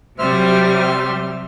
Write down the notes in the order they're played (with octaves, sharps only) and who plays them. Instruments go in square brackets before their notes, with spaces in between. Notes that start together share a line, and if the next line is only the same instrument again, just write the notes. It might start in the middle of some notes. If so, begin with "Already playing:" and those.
[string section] C3 F#3 G3 [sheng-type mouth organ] C5 E5 F6